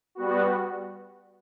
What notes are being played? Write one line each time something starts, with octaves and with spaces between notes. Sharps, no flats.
G3 B3 F#4